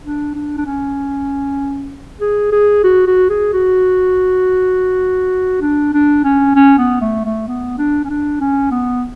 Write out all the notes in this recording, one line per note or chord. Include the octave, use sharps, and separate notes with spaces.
D4
D4
D4
C#4
G#4
G#4
F#4
F#4
G#4
F#4
D4
D4
C#4
C#4
B3
A3
A3
B3
D4
C#4
D4
C#4
B3